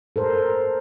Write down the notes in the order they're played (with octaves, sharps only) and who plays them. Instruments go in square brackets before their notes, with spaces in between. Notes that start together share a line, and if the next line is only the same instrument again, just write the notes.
[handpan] A4 A#4 C5